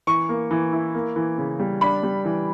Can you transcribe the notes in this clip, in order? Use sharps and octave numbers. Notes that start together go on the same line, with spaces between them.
E3 C#6
A#3
E3
E4
A#3
E3
C#3
G3
D4 B5
G3
E3